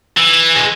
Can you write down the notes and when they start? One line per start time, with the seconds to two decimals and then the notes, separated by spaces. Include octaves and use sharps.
0.17 E3
0.55 G#3